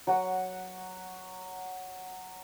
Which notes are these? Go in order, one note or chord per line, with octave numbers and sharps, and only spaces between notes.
F#3 F#5